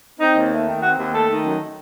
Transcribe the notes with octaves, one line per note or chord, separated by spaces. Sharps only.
C4 D#4
D#2
A3
D#3
C4 F#4
D#2
A3 A4
D#3
F#2